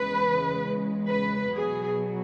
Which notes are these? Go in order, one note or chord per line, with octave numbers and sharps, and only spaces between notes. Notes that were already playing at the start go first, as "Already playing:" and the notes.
Already playing: E2 C#3 G#3 B4
B4
B2 F#3 G#4